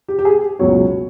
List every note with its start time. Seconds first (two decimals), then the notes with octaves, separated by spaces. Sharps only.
0.08 G4
0.19 G4
0.25 G#4
0.59 C#2 B2 F#3 C#5